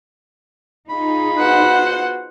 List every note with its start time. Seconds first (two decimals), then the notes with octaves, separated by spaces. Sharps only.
0.89 D#4 F4 G#4 B5
1.39 B3 F#4 C5 F#5